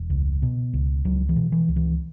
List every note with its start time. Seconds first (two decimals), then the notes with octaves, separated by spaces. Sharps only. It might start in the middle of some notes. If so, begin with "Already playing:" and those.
Already playing: E1
0.10 C#2
0.42 B2
0.73 C#2
1.05 C#2 F#3
1.29 E3
1.36 B2
1.52 E3
1.68 C#2
1.76 E3